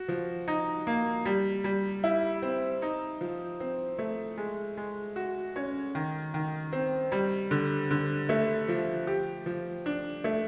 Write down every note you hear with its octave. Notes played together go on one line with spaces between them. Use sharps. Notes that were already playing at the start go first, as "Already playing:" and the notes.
Already playing: F#4
F3
D#4
A#3
G3
G3
E4
C4
D#4
F3
C4
A3
G#3
G#3
F#4
C#4
D#3
D#3
C4
G3
D3
D3
A3
F3
G4
F3
D4
A3